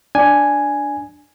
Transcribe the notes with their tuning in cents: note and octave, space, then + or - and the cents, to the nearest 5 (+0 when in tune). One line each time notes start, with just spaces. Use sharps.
D4 +0 G#5 +0